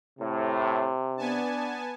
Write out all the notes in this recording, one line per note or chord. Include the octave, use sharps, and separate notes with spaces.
A2 C3
B3 D4 G#5 A5